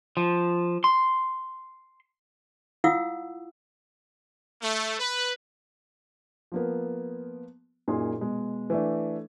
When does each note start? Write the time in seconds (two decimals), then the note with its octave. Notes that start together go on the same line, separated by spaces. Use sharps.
0.17 F3
0.84 C6
2.84 E4 F4 F5 F#5 D#6 E6
4.62 A3
4.99 B4
6.52 F3 A#3 B3
7.88 F#2 A#2 D#4 G#4 C6
8.20 B2 G#3
8.70 E3 A3 D4